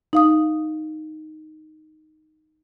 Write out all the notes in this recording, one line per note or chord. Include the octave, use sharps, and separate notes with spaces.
D#4 F5 D#6